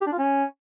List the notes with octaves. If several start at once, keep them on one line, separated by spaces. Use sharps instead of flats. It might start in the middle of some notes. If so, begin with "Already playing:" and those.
G4
D4
F4
C#4